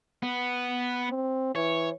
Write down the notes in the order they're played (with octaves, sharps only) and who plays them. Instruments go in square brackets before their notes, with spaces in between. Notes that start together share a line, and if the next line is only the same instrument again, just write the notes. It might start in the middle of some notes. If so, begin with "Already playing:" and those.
[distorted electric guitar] B3
[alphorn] C4
[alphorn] E3 [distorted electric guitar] C#5